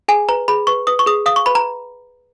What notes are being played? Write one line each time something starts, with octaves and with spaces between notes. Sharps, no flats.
G#4 G#5
B4 A#5
G#4 B5
B4 C#6
B4 D#6
C#6
G#4 D#6
F5 D#6
C#6
B4 B5
A#5